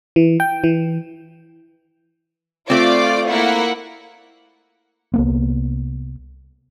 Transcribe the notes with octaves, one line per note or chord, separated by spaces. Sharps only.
E3
G5
E3
A3 C4 F4 D5 D6
A#3 E4 F#5
C2 A#3 B3